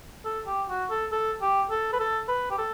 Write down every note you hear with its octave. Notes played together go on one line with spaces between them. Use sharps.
A4
G4
F#4
A4
A4
G4
A4
B4
A4
B4
G4
A4